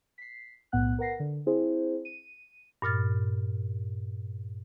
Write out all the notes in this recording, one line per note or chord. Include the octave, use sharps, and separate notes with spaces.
B6 C7
B1 A2 B3 F#5 F#6
A#4 B4 F#5 A#6 C7
D3
C4 E4 G#4 C5
D#7
G2 A#2 F6 A6